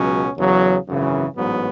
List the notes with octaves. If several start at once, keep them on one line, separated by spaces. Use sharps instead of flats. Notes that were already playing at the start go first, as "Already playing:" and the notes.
Already playing: C#2 B2 F#3 C#4
E2 C#3 F#3
G#1 F#2 C#3 E3
A1 G#2 F#3 B3